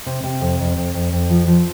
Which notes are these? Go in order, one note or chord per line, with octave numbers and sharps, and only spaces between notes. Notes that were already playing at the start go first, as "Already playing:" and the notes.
C3
C3
F2
F2
F2
F2
F2
F3
F3